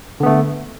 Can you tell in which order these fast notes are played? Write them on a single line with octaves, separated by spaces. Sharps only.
D3 B3 A3